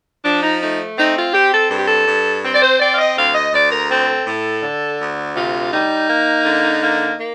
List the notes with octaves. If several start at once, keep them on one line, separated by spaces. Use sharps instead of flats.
F3 D4
D#4
A3 D#4
C4 D#4
F4
C4 G4
A4
G2 A4
G4
A4
G2
C4
D5
C5
C4 D5
F5
D#5
D2 F5
D#5
D2 D5
A#4
C4 A4
A2
D3
D2
C3 F4
G3 D#4
A#3
D3
A#3
A#3